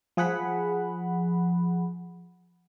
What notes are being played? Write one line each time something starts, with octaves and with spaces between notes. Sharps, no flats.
F3 G#4 F#5 B5